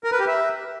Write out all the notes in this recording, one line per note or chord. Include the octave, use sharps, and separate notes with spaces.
A#4
B4
G4
E5